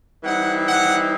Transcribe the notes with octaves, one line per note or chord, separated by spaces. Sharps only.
E3 G3 C4 D#4 F#5
F#5